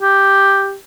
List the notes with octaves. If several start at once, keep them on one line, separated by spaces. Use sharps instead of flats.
G4